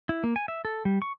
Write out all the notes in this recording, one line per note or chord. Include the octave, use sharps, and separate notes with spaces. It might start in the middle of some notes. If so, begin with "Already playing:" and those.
E4
A#3
G#5
E5
A4
G3
C#6